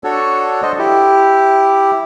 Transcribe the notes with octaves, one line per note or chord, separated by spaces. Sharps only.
D4 F#4 A4 C#5
A4 C5 D#5
E4 G4